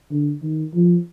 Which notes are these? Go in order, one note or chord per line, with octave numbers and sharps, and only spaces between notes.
D3
D#3
F3